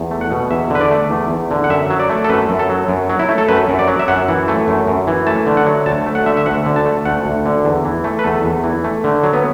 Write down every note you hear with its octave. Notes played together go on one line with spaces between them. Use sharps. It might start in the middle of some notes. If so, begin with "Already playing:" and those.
Already playing: E2
A3
F#5
B2
E2 E5
D3 B4
D5
A3
E2
E2
D3
F#5
F#2 E5
F#3
D5
A3
A4
F#2 B4
F#2
A4
F#3
F#2
F#3
E4
A3
A4
F#2 B4
F#2
D5
F#3
E5
F#2 F#5
E3
A3
F#2
F#2
E3
A3 A5
D3
F#5
F#3
D2 A5
A3
F#5
D3 E5
E5
D2 F#5
D3
A5
A3
D2 F#5
D2
D3
E2
E3
A3
B4
E2 A4
E2
E3
A3
D3
F#3
B3